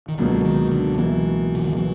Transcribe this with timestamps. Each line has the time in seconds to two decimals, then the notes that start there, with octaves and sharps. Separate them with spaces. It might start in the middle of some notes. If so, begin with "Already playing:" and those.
0.08 D#3
0.17 C#2 B2 D3 F#3 A#3
0.45 D#3
0.71 D3
0.98 C#2 B2 E3 F#3 A#3
1.55 C#3
1.62 D3
1.69 D#3
1.77 B2 E3 F#3